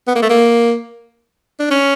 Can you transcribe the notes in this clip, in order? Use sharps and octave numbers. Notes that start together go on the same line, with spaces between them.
B3
A#3
A3
A#3
D4
C#4